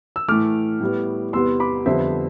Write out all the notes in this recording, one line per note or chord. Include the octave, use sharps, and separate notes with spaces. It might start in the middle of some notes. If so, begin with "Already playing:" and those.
E6
A2 E3 A3 D6 F6
A2 G3 B3
E2 C3 G3 B3 C6 E6
B5 D6
F2 D3 G3 B3 C5 E5